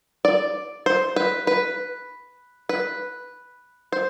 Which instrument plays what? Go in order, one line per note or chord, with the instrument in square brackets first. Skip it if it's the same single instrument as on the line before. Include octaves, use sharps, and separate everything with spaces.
[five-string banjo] D5
C5
B4
B4
B4
C5